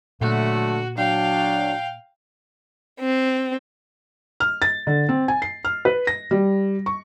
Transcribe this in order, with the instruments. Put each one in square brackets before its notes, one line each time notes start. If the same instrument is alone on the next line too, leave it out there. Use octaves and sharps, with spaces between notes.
[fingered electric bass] A#2 [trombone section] D3 F#3 A3 [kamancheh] F#4
[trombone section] F#3 D4 [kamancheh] F5 G5
[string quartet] C4
[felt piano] F6
A6
D3
C4
G#5
C7
F6
B4
A#6
G3
C#6